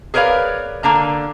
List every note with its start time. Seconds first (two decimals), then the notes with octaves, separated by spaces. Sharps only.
0.14 G#4 A#4 B4 C#5 D5 F5
0.83 D3 A#3 D4 A#5